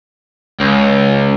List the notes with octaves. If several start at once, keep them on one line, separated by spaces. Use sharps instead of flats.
C#2